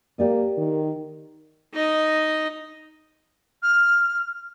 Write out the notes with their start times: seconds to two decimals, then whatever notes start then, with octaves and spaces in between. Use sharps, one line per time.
0.19 A#3 G4 D5 D#5
0.57 D#3
1.74 D#4 D#5
3.63 F6